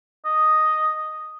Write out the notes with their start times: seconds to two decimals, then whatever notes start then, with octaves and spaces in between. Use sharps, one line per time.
0.25 D#5